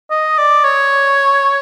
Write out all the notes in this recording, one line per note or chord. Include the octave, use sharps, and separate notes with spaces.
D#5
D5
C#5